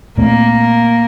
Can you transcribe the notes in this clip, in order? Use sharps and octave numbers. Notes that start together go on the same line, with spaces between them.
A#2 A3 A#3 C4